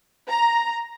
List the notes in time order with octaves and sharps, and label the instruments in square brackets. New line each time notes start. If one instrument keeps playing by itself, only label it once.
[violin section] A#5